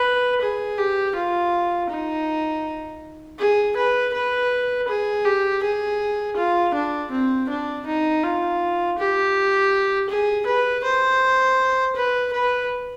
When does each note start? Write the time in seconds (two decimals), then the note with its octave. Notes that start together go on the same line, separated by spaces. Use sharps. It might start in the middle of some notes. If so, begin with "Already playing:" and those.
Already playing: B4
0.41 G#4
0.78 G4
1.15 F4
1.89 D#4
3.39 G#4
3.76 B4
4.13 B4
4.88 G#4
5.25 G4
5.63 G#4
6.37 F4
6.74 D4
7.11 C4
7.49 D4
7.86 D#4
8.23 F4
8.98 G4
10.09 G#4
10.47 B4
10.84 C5
11.96 B4
12.33 B4